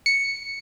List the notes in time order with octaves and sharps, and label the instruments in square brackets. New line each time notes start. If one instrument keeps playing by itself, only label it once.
[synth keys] C#7